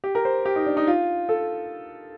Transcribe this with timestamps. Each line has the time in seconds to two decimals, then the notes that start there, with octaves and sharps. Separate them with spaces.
0.04 G4
0.15 A#4
0.25 C5
0.45 G4
0.56 D#4
0.66 D4
0.77 D#4
0.87 F4
1.29 A4